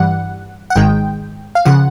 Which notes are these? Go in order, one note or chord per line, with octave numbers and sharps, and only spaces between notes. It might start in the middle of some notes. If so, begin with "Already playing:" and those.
Already playing: G2 E3 G3 F#5
F#5
G#1 G#2 D#3 G#3 G5
F5
C#3 F3 F#5